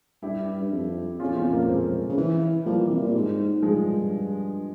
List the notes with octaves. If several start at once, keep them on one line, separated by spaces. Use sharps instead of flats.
G2 E4 G4
G2
F2
F2 C#4 F4
E2
C#4 F4
F2
A#3 C#4
A#3
G#3 C4
C#3
E3
F3 G3 A#3
E3
C3
A#2
G#2
G2 F3 G#3